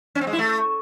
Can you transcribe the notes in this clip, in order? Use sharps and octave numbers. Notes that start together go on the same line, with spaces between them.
C#4
C4
G#3
E4
A3